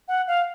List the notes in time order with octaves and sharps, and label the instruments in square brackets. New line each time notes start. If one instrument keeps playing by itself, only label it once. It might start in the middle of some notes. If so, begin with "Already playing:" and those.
[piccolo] F#5
F5